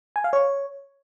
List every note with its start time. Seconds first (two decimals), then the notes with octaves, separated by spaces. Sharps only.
0.16 G#5
0.24 F5
0.33 C#5